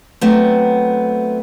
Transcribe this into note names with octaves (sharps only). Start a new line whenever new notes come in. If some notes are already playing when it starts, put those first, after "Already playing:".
F#3 A3 B3 C4